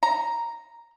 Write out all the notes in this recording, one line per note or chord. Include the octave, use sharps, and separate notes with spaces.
A#5